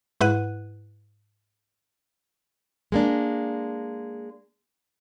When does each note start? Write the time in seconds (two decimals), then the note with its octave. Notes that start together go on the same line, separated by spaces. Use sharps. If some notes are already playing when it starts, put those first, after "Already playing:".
0.21 G#2 E4 B4 F#5 F#6 D#7
2.92 G#3 A#3 D4